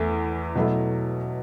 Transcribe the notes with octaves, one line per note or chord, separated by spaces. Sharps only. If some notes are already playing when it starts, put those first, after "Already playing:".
Already playing: E2 E3 A3
B2 F#3 A3 E4